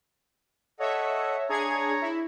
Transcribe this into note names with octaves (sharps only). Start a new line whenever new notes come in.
A4 C#5 D#5 E5 F#5
D4 G#4 C#5 A#5 G#6
E4